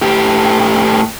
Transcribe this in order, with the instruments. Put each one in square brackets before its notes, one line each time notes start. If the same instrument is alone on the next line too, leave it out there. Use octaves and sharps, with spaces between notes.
[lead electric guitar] A2 G4